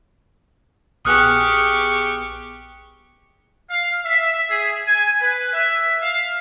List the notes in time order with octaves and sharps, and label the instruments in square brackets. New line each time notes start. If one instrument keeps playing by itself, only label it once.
[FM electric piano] A#1 B3 G#4 [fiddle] G4 C#6 [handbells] D#6 F6 F#6
[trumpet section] F5
E5
G#4
G#5
B4
E5
F5